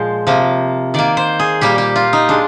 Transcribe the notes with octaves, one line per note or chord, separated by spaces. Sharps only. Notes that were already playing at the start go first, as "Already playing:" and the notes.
Already playing: A#2 F3 G#3 C5
C3 F3 A#3
D#3 A#3 D5
C5
G#4
A#2 G3 A#3 G4
G4
F4
D#4
G#3 D4